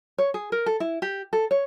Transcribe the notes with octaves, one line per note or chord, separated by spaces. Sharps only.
C#5
G#4
A#4
A4
E4
G4
A4
C#5